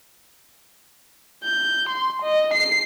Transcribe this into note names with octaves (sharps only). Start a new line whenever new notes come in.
G6
C6
D#5
C7